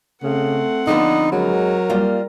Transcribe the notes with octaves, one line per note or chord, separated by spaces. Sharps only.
C#3 A3 C4 F#5
D3 F3 B3 D#4
F#3 G#3 A#4
G3 A#3 F4